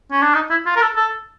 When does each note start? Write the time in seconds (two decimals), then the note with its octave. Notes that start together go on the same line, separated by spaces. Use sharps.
0.12 C#4
0.22 D4
0.34 D#4
0.50 E4
0.66 F4
0.76 A#4
0.81 A4
0.96 A4